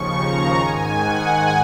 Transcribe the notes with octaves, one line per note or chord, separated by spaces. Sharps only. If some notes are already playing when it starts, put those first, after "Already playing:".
Already playing: D#2 C#3 F3 C#6
A#5
G#2 D#3 G#5
F#5